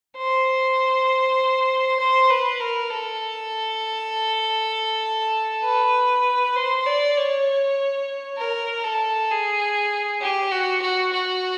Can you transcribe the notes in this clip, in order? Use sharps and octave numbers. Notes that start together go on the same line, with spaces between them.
C5
C5
B4
A#4
A4
B4
C5
D5
C#5
A#4
A4
G#4
G4
F#4
F#4
F#4